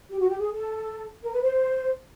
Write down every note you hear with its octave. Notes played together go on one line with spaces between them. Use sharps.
G4
F#4
G4
G#4
A4
A#4
B4
C5